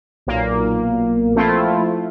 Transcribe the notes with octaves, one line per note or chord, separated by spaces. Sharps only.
B1 A#2 A#3
F3 A3 C4 E4 F4